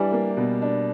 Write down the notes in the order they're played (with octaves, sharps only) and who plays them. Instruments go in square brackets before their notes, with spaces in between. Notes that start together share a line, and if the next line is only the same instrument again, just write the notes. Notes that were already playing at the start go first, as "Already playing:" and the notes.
Already playing: [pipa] E3 [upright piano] G3 D4
[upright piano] A#3
B2
D4